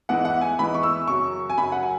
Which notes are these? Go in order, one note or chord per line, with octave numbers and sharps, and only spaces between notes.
E2 E3 G#3 F#5
F#5
G#5
E2 E3 G#3 B5
C#6
E6
F#2 C#3 F#3 C#6
G#5
F#2 C#3 F#3 B5
F#5
G#5